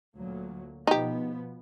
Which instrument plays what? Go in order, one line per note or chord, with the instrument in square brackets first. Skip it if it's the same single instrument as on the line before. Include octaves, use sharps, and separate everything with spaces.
[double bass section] D2 A#2 F#3
[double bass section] B2 F3 B3 [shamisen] D#4 G4